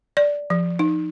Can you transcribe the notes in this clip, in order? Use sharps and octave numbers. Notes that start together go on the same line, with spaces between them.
D5
F3
D#4